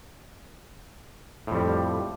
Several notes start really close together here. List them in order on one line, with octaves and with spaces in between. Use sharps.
A2 F2 G3